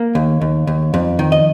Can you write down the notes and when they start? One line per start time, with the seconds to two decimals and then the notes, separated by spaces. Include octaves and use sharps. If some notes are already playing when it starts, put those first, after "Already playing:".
Already playing: A#3
0.15 D#2
0.41 D#2
0.67 D#2
0.94 F2
1.19 D#3
1.32 D#5